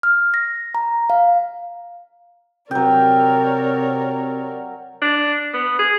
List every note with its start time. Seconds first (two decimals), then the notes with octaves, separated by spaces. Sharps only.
0.03 F6
0.34 A#6
0.75 A#5
1.10 F5
2.71 C3 F#3 A#4 C#5 D5 G5
5.02 D4
5.54 B3
5.79 G#4